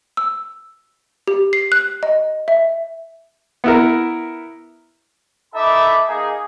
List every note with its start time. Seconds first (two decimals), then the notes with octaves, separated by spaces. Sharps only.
0.17 E6
1.28 G4
1.53 C7
1.72 F#6
2.03 D#5
2.48 E5
3.64 B3 E4 A#4
5.54 D#4 A4 E5 B5 D6
6.08 A#3 D#4 G#4